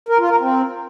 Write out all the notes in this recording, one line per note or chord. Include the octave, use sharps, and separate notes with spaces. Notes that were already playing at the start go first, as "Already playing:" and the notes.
A#4
F4
A#4
C4